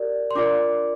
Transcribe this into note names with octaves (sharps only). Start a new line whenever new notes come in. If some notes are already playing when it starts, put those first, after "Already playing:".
Already playing: G4 A#4 D5
C6
D4 F4 A#4 D5 D6